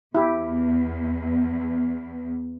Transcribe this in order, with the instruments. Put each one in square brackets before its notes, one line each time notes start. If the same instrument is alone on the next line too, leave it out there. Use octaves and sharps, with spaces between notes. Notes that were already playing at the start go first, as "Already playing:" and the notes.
[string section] E2 [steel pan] E4 G4